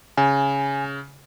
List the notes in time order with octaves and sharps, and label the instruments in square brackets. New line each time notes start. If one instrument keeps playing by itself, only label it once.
[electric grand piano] C#3 [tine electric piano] G#5